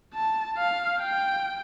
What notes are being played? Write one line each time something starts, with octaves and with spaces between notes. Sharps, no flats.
A5
F5
G5